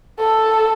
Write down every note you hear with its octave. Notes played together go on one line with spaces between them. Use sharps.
A4